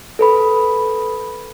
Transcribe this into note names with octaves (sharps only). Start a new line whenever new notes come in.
A4 B4 B5